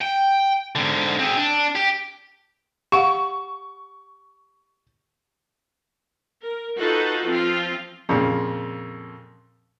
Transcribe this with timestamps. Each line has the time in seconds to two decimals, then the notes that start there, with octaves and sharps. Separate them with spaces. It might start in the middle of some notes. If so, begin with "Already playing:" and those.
0.02 G5
0.76 G#2 D3
1.19 C4 G#4
1.37 D4
1.75 G4
2.92 G4 F5 F#5 C#6
6.43 A#4
6.78 D#4 F4 F#4 A4 B4
7.28 F3 C4 F4
8.09 F2 A#2 C#3